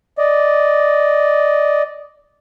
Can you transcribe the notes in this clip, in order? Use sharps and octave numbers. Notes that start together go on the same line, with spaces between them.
D5 D#5